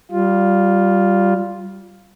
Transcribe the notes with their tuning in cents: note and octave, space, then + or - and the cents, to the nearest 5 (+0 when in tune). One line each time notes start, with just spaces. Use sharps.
G3 -15 F4 +0